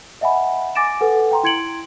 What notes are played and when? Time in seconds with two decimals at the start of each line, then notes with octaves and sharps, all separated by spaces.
0.21 D#5 E5 F#5 G#5 B5
0.75 G#5 D6 A6 A#6 D7 E7
1.00 A4 B4 F#5 G#5
1.31 G5 A#5 C6
1.43 E4 C6 G#6 C#7 D7 F#7